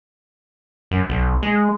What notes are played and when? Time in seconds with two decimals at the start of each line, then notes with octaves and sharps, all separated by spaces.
0.91 F#2
1.10 B1
1.43 G#3